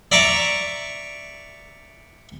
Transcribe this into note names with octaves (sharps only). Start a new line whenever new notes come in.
D5 E5 A#5 C#6 D6